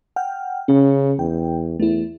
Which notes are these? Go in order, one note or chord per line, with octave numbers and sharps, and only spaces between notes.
F#5 G5 F6
C#3 C#4
E2 G5
E2 A3 E4